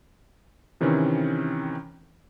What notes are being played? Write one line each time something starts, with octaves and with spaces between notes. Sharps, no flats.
C3 D#3 E3 C4 C#4